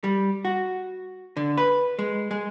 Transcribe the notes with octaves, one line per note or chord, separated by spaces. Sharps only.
G3
F#4
D3
B4
G#3
G#3